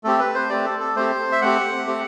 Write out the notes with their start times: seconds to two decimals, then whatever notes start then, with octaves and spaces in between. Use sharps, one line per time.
0.04 A3 C4 G4 A4
0.20 B4
0.34 C5
0.49 A3 C4 G4 D5
0.64 A4
0.80 A4
0.95 A3 C4 G4 C5
1.32 E5
1.42 A3 C4 G4 F#5
1.86 A3 C4 G4